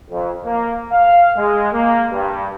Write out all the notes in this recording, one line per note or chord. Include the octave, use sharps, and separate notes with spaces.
F2
A#3
F5
G#3
A#3
G2